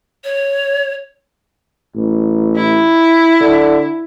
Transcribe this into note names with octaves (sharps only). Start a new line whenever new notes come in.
C#5
A1
E4
D3